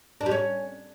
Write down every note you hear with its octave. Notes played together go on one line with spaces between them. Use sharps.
D4
G3
C#4